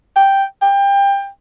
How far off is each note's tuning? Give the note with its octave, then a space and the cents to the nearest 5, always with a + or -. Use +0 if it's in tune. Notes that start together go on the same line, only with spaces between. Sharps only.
G5 +0
G5 +25